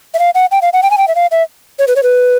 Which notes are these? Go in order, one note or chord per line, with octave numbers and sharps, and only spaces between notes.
E5
F5
F#5
G5
F5
F#5
G5
G#5
G5
E5
F5
E5
C#5
B4
C#5
B4